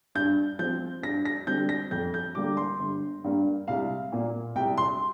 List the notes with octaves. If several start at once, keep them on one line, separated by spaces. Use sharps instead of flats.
G2 G6
F3 C4 G6
G2 A#6
A#6
D3 G3 C4 G6
A#6
F2 G6
G6
D3 G3 A#3 D6
C6
G1
G2 G3 A#3
C2 F5
A#2 A#3
C2 G5
C6